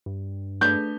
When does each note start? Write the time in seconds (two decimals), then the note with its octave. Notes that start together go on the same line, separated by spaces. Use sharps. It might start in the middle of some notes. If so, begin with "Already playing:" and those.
0.06 G2
0.61 A3 D4 B4 G6